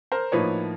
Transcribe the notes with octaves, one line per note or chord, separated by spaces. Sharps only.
A#4 C5
A2 F3 A#3 D#4 B4 C#5